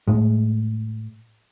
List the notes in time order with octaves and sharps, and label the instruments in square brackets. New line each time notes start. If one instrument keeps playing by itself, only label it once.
[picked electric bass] A2 G#3